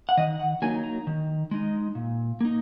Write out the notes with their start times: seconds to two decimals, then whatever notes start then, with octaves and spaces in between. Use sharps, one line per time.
0.09 F#5
0.17 D#3 D#5
0.39 F#5
0.62 F#3 A#3 D#4 G#5
0.84 A#5
1.07 D#3
1.51 G#3 D#4
1.95 A#2
2.41 A#3 D#4